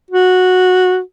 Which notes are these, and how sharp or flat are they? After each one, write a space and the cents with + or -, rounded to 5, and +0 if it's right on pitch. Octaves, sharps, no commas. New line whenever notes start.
F#4 -10